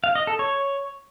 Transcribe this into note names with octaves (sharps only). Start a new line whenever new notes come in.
F5
D#5
A4
C#5